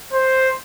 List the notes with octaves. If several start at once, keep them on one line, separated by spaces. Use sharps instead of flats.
C5